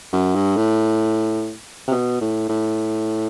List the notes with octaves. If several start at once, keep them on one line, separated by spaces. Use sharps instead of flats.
F#2
G2
A2
C3
B2
A2
A2